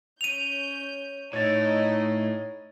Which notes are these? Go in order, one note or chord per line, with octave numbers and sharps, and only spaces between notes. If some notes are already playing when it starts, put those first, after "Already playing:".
C#4 G6 D#7 F7
A2 D#4 C#5 D#5 A6